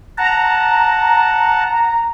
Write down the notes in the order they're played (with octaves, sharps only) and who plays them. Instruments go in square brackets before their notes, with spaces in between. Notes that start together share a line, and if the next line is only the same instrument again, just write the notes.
[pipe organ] F#5 A5 [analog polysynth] A#5